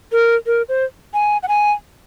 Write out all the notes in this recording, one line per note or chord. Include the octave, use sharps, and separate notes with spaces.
A#4
A#4
C5
G#5
F#5
G#5